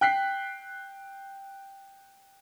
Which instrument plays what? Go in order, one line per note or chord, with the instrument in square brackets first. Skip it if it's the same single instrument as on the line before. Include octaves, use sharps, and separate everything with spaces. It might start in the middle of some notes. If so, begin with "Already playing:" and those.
[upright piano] G5 F#6 B6 C7